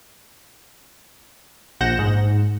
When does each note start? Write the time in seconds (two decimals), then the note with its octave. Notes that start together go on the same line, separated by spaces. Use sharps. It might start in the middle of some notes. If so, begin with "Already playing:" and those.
1.80 A#1 F#5 G6 A#6 E7
1.99 G#2